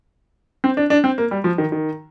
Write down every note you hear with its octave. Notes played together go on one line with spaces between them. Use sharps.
C4
D4
D4
C4
A#3
G3
F3
D#3
D#3